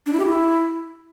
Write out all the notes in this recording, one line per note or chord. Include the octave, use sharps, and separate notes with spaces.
D4
E4
G4
E4